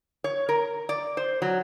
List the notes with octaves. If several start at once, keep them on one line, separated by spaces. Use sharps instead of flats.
C#5
A#4
D5
C5
F#3